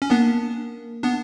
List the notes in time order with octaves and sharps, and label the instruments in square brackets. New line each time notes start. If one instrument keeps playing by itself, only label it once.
[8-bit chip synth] C#4
[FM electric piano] A#3 [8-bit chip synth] B3 D4
[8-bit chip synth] B3 D4